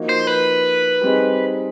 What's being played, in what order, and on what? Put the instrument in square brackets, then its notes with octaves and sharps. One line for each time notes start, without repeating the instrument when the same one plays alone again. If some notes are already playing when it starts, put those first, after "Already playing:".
Already playing: [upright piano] F3 A#3 D#4 F#4
[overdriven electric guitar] C5
B4
[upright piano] G3 C4 D#4 G#4